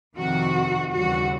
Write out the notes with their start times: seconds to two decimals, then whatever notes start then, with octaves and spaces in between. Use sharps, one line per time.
0.17 F2 C3 D#3 F#4
0.91 D#2 C#3 E3 G3 F#4